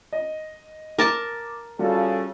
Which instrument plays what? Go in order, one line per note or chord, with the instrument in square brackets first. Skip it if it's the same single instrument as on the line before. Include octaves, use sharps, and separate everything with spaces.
[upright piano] D#5
[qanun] A#4 A5 [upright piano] D6
[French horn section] C#3 A4 [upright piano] G3 F4 F#4